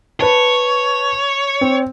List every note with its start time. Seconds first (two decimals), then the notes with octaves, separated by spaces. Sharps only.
0.21 B4 C#5 A5
1.61 C4